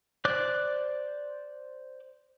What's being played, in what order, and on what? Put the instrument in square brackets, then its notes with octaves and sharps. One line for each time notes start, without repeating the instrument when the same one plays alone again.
[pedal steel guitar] C5 D5 D6 F#6